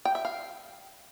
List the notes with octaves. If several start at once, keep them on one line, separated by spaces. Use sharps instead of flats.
G5
E5
F5